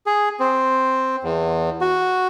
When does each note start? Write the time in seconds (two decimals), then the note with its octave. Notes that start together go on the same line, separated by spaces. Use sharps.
0.06 G#4
0.40 C4
1.23 E2
1.81 F#4